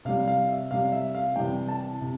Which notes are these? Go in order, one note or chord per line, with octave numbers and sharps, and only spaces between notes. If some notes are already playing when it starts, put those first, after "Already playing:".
C3 G3 F5
F5
E5
C3 G3 F5
E5
F5
C3 E3 G3 G5
A5
C3